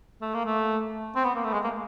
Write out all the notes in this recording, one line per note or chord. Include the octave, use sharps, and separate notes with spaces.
A3
A#3
A3
C4
B3
A#3
A3
G#3
A#3